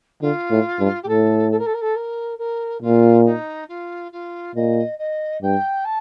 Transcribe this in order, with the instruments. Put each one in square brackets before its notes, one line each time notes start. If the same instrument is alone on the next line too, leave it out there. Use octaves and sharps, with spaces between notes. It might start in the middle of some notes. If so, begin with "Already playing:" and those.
[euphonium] D3 [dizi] F4
[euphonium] A2
G2
[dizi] G4
[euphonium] A2 [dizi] A4
[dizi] A4
A#4
A4
A#4
A4
A#4
A#4
[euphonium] A#2 [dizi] F4
[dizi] D#4
F4
F4
[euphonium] A#2 [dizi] D#5
[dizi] D#5
[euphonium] G2 [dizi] G5
[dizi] A5